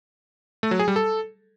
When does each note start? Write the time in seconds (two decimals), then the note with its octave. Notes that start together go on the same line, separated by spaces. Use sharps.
0.63 A3
0.71 F#3
0.79 G#4
0.88 G3
0.96 A4